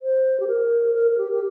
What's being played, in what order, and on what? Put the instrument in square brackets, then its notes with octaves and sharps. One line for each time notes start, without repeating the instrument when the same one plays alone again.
[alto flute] C5
G4
A#4
A#4
A#4
G4
G4